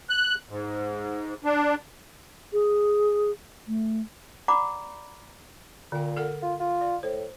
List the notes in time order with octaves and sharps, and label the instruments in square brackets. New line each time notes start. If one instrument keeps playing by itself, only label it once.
[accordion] F#6
G#2
D4
[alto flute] G#4
A3
[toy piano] D5 F#5 A#5 B5 D6
[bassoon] A#2 [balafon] D3 G5
[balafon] A4 A#4 F#5
[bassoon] F4
F4
[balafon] D5
[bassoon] A2 [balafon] C5